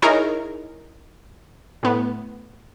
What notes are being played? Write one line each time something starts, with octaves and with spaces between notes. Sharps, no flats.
D#4 E4 G#4 A#4 C#5
A2 B3